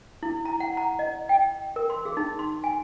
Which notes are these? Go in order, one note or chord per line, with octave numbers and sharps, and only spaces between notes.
E4
A#5
F#5
A#5
D#5
G5
A#4
C6
G#4
D#4
C6
G#5